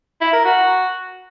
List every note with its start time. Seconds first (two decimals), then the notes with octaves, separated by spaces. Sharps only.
0.21 E4
0.33 A#4
0.45 F#4